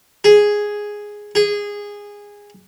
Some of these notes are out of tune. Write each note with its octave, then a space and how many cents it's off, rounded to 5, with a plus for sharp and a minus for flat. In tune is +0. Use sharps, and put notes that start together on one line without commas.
G#4 +0
G#4 -15